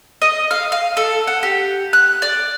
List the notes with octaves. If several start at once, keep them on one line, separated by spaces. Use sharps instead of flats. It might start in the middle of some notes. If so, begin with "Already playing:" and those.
D#5
F5
F5
A4
F#5
G4
F#6
D5